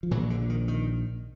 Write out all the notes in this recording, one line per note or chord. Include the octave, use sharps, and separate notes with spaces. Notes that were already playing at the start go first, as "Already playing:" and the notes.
F3
A#1 A#2 E3 F#3
D3
D#3
D#3